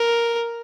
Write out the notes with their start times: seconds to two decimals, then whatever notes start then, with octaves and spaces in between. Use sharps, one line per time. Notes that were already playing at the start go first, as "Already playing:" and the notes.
Already playing: A#4